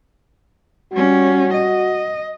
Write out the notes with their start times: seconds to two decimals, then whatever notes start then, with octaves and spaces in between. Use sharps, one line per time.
0.93 G3 C#4 F#4
1.53 D#5